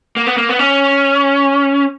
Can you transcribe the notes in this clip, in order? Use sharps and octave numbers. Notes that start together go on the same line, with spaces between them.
A#3
B3
A#3
B3
C#4